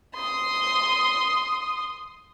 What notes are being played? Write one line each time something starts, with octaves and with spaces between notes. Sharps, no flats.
C6 D#6